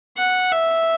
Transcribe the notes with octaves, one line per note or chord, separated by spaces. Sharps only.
F#5
E5